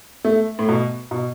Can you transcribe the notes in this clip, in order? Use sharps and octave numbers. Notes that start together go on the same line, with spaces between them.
A3
A2
B2
B2